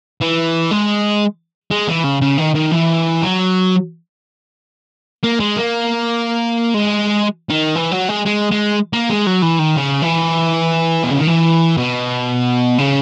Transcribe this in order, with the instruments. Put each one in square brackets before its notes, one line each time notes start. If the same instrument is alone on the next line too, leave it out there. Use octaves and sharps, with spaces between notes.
[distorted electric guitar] E3
G#3
G#3
E3
C#3
C#3
D#3
D#3
E3
F#3
A#3
G#3
A#3
G#3
D#3
E3
F#3
G#3
G#3
G#3
A#3
G#3
F#3
E3
D#3
C#3
E3
B2
C#3
D#3
E3
B2
C#3